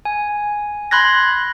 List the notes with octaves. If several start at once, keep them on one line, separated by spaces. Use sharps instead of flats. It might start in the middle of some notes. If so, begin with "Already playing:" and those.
G#5
B5 C6 F#6 G#6 A#6